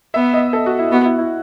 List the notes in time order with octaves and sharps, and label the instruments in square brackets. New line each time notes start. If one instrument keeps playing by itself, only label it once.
[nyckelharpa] B3 [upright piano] E5
[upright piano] D#5
A4
F#4
E4
[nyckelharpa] B3 [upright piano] F#4
[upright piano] E4
E4